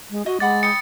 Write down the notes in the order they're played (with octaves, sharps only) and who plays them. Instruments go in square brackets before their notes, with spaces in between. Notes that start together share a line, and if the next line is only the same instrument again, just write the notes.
[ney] G#3
[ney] F#4 [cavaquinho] D#5
[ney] G#3 [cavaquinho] D5 F#5 B5 [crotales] A6
[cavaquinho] G5 B5 D#6 [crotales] C#7